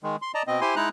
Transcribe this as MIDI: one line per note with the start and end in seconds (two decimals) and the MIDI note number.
0.03 0.16 51
0.03 0.16 56
0.22 0.32 84
0.34 0.43 74
0.34 0.43 75
0.34 0.43 81
0.34 0.43 82
0.47 0.61 47
0.47 0.61 60
0.47 0.61 75
0.61 0.75 64
0.61 0.75 67
0.61 0.75 72
0.61 0.75 80
0.61 0.75 84
0.76 0.89 56
0.76 0.89 63
0.76 0.89 64
0.76 0.89 82
0.76 0.89 90